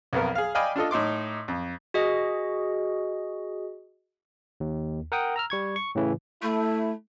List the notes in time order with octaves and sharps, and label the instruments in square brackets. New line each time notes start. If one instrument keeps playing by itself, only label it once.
[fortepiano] B1 F2 B3 A#4
G#4 F5
D5 D#5 F5 G5 G#5 B5
D4 F4 A4 D#5
A2 D#4 C6 D6
F2
[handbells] F#4 G#4 D#5
[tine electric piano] D#2
A#4 F#5 G5 D#6
A#5 E6 F6
G3 C#6 G#6
C#6
A2 C#3 E3
[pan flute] A3 [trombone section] E4 A4